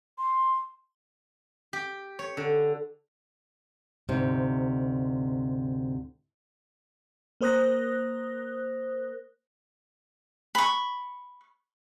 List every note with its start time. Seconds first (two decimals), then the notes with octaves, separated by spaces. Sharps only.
0.18 C6
1.73 G4
2.19 C#5
2.37 D3
4.09 D2 G#2 C3
7.41 A#3 A#4 C5 D#6 F#6 A#6
10.55 B5 C#6